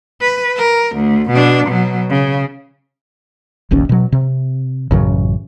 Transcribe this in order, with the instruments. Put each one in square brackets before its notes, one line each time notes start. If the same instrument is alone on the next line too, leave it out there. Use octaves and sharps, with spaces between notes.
[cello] B4
A#4
D2
B2 D4
B2 F#3
C#3
[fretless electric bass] F1 A#1 D#2 C#4
B2 F#3
C3
A1 F#2 C#3 F#3